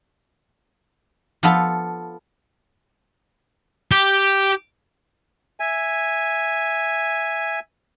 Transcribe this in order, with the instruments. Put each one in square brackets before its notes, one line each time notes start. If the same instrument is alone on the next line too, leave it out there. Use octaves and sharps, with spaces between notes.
[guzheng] F3 B3 F4 A4
[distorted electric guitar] G4
[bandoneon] E5 G#5